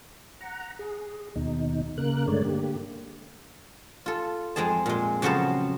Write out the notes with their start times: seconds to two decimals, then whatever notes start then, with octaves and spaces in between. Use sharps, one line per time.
0.40 F#5 A#5
0.79 G#4
1.36 D#2 B2 D#4
1.98 C#3 A#3 A#4 F#6
2.28 G2 D3 G#3 A3 C#5 D5
2.45 D3 A#3 G4
4.06 F4 A4
4.56 F2 G#3 C4 G#4 A5
4.86 A#2 G#3
5.22 F2 C#3 F#3 B3 C5 A5